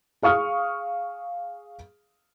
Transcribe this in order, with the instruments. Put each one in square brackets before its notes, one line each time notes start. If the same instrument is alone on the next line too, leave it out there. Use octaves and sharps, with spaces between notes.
[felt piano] G#4 F5 C#6 D#6 F6